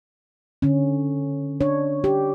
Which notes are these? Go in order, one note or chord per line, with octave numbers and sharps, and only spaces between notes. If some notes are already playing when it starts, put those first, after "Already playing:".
D3 C#4
D4 C#5
G4